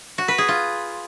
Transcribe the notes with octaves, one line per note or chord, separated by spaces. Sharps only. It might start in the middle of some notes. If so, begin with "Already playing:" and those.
F#4
B4
G#4
F4